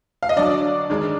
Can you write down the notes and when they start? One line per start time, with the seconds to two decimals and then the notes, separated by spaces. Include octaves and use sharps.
0.23 F5
0.29 D#5
0.36 D3 F#3 D4 D5
0.90 D#3 G#3 D4